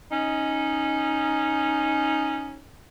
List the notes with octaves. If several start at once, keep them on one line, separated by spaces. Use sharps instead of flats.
C#4 D#4